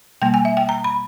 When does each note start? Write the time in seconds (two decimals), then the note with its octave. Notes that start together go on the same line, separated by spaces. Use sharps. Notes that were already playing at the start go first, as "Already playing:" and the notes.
0.22 B2 G3 A#3 G5
0.34 G#5
0.45 E5
0.57 G5
0.69 A#5
0.84 B5